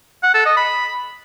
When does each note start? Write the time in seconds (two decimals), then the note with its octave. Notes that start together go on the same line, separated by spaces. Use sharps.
0.23 F#5
0.34 A4
0.45 D#5
0.57 B5